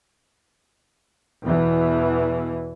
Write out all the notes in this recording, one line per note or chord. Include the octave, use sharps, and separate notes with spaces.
E2 B2 E3